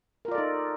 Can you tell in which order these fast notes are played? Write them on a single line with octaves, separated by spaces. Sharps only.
A#4 F4 D5 A4 D#4